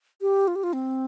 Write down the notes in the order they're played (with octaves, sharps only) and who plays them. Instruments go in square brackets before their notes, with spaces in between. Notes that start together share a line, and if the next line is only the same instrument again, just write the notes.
[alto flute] G4
F4
G4
F4
C4